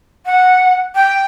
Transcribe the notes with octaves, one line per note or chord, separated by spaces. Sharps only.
F#5
G5